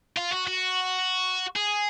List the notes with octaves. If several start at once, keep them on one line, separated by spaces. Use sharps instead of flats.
F4
F#4
F#4
G#4